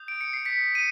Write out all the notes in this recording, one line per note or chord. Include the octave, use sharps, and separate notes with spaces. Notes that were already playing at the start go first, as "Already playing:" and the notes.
Already playing: D#6 G6
D7
C#7
C7
B6 C#7
C#7 D#7